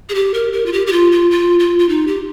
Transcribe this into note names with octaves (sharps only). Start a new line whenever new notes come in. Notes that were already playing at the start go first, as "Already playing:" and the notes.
G#4
G4
A#4
A#4
F4
G4
G4
F4
F4
F4
F4
F4
D#4
G4